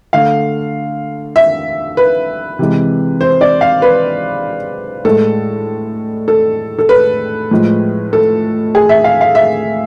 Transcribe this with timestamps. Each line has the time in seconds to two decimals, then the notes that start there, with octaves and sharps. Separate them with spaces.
0.13 D3 A3 F5
1.36 E5
1.97 B4
2.59 C3 E3 G#3
3.21 C5
3.41 D5
3.61 F5
3.82 B4
5.05 A2 G#3 A4
6.28 A4
6.79 A4
6.89 B4
7.51 A2 F3 G#3
8.13 A4
8.75 G#4
8.89 E5
9.04 F5
9.21 F5
9.35 E5